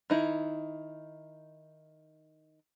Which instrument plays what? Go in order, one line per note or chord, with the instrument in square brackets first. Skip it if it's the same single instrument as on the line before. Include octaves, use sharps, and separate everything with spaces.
[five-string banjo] D#3 D#4 E4